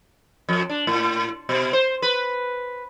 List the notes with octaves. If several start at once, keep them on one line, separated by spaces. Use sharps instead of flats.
F2
D4
A2
B2
C5
B4